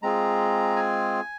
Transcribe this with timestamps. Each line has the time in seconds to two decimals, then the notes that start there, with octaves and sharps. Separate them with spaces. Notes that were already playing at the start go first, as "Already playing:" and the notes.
0.02 G#3 C4 F4 G#4 A#5
0.76 G#5